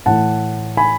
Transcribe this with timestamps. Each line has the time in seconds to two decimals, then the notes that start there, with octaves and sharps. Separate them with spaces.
0.06 A2 E3 F#5 A5
0.77 G#5 B5